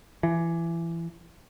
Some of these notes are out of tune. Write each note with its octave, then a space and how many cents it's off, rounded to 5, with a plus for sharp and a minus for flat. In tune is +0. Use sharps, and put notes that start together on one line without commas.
E3 +25